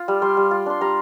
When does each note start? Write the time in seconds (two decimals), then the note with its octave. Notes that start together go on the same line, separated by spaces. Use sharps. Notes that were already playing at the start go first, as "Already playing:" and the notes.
Already playing: F4
0.08 G3
0.22 G3 C6
0.37 G3
0.51 F4
0.66 D4 C6
0.81 G3 A#5